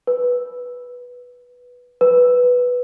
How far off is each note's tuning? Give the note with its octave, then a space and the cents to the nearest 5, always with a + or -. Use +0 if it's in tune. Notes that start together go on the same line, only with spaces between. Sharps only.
B4 -5
B4 +0